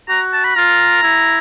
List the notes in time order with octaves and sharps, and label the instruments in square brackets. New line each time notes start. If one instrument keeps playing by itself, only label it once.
[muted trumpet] F#4 [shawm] A#5
[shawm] A5
B5
[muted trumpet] F4 [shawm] A#5
[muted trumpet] E4